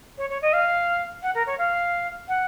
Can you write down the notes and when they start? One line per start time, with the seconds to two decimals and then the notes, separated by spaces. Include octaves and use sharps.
0.18 C#5
0.29 C#5
0.42 D#5
0.53 F5
1.22 F#5
1.34 A#4
1.46 C#5
1.58 F5
2.28 F#5